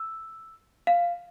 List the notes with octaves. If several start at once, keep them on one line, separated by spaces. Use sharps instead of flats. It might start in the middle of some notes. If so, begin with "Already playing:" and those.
Already playing: E6
F5